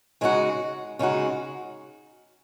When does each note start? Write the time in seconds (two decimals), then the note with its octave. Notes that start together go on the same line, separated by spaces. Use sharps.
0.21 C#3 G#3 D#4 F#4
0.99 C#3 G#3 D#4 F#4